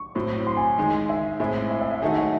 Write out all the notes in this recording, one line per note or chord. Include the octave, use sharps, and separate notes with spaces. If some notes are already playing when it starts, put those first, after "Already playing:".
Already playing: C#6
A2 F#3 C4
C6
G#5
D#3 G#3 D#4 G#4
E5
A2 G#3 C4 E4 G#4
E5
E5
E5
D#3 F#3 A3 D#4 G#4 F#5
E5